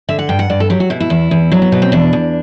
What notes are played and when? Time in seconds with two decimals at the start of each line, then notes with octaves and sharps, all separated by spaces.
0.09 D3 E5
0.19 F#5
0.29 G2 G5
0.39 F#5
0.50 G2 D5
0.60 A4
0.70 F#3 G4
0.80 F#4
0.90 B2 E4
1.00 E4
1.10 E2
1.31 E2
1.52 F#3 D4
1.62 B3
1.72 B2 B3
1.82 C4
1.92 E2 D4
2.13 E2